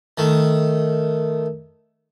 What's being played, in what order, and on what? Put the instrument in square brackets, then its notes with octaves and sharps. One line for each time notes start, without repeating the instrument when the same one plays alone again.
[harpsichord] D#3 A3